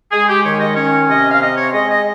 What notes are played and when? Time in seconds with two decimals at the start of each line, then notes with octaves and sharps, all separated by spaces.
0.12 G#3 G#4
0.28 G4
0.44 D#3 C#5
0.60 D#5
0.76 C#4 C#5
1.09 C3 D#5
1.30 F5
1.41 C4 D#5
1.57 C#5
1.73 G#3 D#5
1.90 D#5